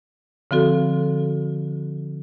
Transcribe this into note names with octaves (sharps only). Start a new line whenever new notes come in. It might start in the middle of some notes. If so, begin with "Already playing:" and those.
D3 F3 C4 F#4 A4